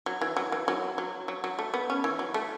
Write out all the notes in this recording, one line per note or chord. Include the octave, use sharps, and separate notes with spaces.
F#3
E3
F#3
E3
F#3
F#3
F#3
F#3
A3
B3
C#4
E3
F#3
A3